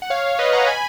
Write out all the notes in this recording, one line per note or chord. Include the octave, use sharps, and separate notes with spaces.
F#5
C#5 F5
F5
B4 D#5
F#5 A#5
G#5 B5